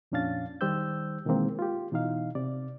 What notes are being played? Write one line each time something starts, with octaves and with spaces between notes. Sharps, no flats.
F2 A#2 C#4 D4 F5 A6
D#3 G3 G4 C5 E6 G6
B2 D#3 E3 G#3 A#3 C4
F4 G4
B2 E3 D#4 F5
C3 D5